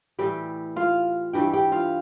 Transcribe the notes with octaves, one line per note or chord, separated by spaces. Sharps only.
A2 E3 G3 G4 G5
F4 F5
G2 E3 G3 G4 G5
G4 G5
F4 F5